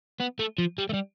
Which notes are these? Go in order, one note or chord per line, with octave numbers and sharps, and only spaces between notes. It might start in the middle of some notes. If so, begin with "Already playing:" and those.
B3
A3
F3
G3
A3
G3